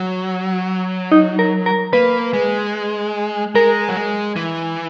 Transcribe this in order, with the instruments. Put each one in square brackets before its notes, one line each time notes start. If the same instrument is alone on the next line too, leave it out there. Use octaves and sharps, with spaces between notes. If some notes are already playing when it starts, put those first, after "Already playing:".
Already playing: [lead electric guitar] F#3
[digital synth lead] D#4
A#4
A#4
[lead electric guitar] A#3 [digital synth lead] B4
[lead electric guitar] G#3
[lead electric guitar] G#3 [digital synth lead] A#4
[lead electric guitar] F#3
G#3
E3